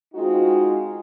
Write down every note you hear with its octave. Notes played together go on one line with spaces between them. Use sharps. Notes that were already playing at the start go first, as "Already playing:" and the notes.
G#3 C4 D#4 F4 F#4